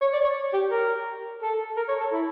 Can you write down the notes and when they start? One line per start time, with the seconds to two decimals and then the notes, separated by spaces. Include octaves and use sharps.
0.01 C#5
0.13 D5
0.24 C#5
0.53 G4
0.71 A#4
1.42 A4
1.77 A#4
1.88 C#5
2.00 A4
2.12 E4